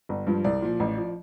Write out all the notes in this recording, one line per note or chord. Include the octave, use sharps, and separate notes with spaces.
G1
G2 F3
C2 D5
A#2 F3
A1
F3